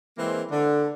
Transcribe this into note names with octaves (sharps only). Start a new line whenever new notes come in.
E3 G#3 A#3 C4
D3